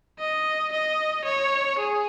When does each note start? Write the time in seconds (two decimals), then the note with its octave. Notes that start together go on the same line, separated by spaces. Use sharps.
0.19 D#5
0.73 D#5
1.25 C#5
1.79 G#4